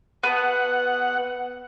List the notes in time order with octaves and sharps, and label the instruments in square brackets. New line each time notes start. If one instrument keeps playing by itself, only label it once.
[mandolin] B3 [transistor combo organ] F#5